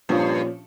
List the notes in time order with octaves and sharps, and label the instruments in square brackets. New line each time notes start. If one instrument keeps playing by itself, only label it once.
[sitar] G2 [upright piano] A#2 F3 C#4 F4